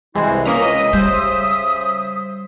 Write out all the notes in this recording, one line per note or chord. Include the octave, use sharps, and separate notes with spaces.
C2 E3 G#3 E4 F#4 C5
C#3 A#3 C#4 E5 A#5 D#6
C#2 D#5 D#7
G3 C5